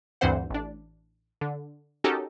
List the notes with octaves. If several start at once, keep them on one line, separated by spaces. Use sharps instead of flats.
D2 G2 E3 C4 C5 F#5
A1 D4
D3
C#4 D#4 F#4 G4 A4 A#4